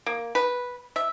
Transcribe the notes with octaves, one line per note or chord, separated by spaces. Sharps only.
A#3
B4
E5